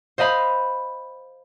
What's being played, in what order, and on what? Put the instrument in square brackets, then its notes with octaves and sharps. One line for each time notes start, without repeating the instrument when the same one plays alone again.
[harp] C5 D#5 F5 B5